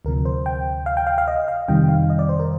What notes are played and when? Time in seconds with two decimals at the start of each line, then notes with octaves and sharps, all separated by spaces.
0.05 D2 C3 F3 A#4
0.25 C5
0.46 G5
0.86 F5
0.97 G5
1.07 F5
1.18 F5
1.28 D#5
1.48 F5
1.68 F2 C3 D#3 G3 G5
1.89 F5
2.10 D#5
2.19 D5
2.29 C5
2.39 A#4